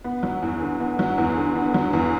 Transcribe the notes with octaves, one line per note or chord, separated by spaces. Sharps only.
B3
F#3
E2
D3
B3
F#3
E2
D3
B3
F#3
E2